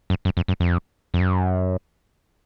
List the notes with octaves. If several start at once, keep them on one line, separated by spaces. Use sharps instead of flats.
F#2
F#2
F2
F#2
F2
F2
F#2